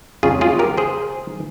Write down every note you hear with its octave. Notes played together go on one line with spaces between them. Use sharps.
F2 C#3 G#3 C#4 F4 G#4
F4 G#4
G4 A#4
G#4 C5